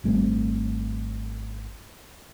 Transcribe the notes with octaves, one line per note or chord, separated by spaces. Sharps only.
G#1 G3 A3 C4